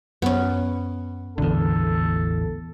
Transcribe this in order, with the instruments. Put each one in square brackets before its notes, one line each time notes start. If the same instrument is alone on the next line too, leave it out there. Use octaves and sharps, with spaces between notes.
[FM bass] F#2 [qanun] B3 C#4
[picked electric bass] A1 E2 [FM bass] D3 [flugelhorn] A4